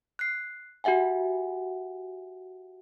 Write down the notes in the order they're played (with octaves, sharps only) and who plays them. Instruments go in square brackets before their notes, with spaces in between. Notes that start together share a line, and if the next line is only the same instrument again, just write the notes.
[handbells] F#6 C7
F#4 G4 E5 F#5 G#5